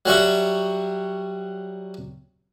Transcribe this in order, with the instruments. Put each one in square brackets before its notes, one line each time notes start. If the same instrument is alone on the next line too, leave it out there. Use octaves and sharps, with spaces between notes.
[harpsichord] F#3 G3 F#4 E5